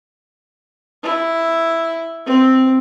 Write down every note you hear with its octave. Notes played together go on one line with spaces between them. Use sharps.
E4
C4